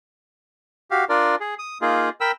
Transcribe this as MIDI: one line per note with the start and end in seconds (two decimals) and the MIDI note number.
0.91 1.05 66
0.91 1.05 67
0.91 1.05 77
1.09 1.35 62
1.09 1.35 65
1.09 1.35 70
1.09 1.35 74
1.40 1.55 68
1.59 1.78 87
1.81 2.09 58
1.81 2.09 63
1.81 2.09 65
1.81 2.09 68
2.21 2.32 70
2.21 2.32 79
2.21 2.32 83
2.21 2.32 88